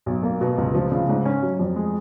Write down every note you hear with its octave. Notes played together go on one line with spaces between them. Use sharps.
B1
A#3
B2
C#2
F3
C#3
G#2
C#4
F#3
F2
G#3